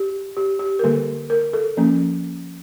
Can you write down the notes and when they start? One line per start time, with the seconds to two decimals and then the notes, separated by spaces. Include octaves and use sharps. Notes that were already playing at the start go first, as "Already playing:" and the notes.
Already playing: G4
0.37 G4
0.60 G4
0.79 A#4
0.83 D3 G3 A#3 A4
1.30 A#4
1.53 A4
1.77 F3 A#3 C#4